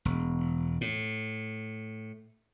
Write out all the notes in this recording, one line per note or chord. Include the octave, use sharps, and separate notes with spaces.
E1
A2